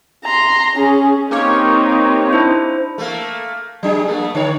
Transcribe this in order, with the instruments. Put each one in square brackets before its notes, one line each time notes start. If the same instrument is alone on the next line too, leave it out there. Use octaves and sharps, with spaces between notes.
[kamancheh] A#5 C6
C#4 G#4
[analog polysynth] A#3 G4 C#5 [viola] C4 D#4
[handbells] D4 E4 C5
[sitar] A3 A#3
F#3 D4 G#4
A3 A#3
D3 C#5